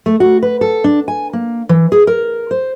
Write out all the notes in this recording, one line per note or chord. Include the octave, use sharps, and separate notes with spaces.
A3
F#4
B4
A4
D4
G#5
A#3
E3
G#4
A#4
C5